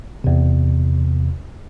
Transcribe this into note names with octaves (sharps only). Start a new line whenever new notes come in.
E2 C3